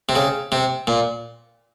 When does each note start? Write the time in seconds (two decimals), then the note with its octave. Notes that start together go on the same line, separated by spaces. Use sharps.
0.09 C3
0.16 C#3
0.52 C3
0.87 A#2